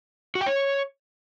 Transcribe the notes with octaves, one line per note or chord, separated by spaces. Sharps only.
F#4
G5
C#5